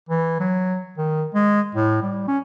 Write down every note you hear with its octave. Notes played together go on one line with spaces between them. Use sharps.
E3
F#3
D#3
G#3
A2
G3
C#4